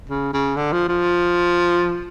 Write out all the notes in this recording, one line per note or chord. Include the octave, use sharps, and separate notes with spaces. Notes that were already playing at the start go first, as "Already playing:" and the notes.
C#3
C#3
D3
F3
F3